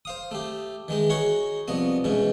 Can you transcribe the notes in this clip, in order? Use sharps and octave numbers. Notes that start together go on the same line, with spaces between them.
C5 F5 D#6
A3 G4
D#3 E3 G#3 D#4
D#4 F#4 G#4 C#5 F#5 C#6
C2 F3 B3 D#5
G#2 B2 E3 C#4